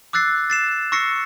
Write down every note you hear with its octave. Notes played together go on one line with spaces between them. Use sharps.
D6 E6 F#6 A6 C7
A6 C7 E7
C#6 E6 A#6 C7 C#7